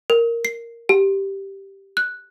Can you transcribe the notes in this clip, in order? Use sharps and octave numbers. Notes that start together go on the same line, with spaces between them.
A#4
C7
G4
F#6